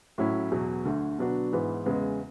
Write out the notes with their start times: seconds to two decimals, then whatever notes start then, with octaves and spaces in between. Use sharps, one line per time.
0.18 A2 F#3 C#4 E4
0.52 E2 B2 F#3
0.85 D2 D3 A3
1.19 B2 F#3 B3 D4 F#4
1.53 G#2 E3 B3
1.86 E2 C#3 G#3 B3